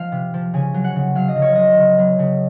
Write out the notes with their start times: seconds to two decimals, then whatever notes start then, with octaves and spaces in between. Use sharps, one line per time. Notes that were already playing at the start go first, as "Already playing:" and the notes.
Already playing: F3 F5
0.12 C3
0.34 F3
0.54 C#3 G#5
0.74 F#3
0.84 F#5
0.96 C#3
1.15 F#3 F5
1.28 D#5
1.36 C#3
1.42 C#5
1.55 F#3 D#5
1.77 C#3
1.98 F#3
2.19 C#3